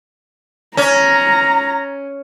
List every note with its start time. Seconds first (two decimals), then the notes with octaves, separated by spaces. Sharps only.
0.77 C#4 A#5